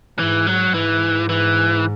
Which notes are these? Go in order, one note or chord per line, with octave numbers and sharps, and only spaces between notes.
G#2 E3
F#3
G#2 E3
E3